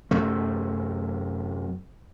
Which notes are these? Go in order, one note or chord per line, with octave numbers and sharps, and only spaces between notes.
F#2 C3 A3